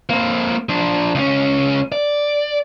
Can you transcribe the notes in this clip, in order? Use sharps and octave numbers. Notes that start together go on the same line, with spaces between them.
A#3 C4
F3 D4
C#2 C#4
D5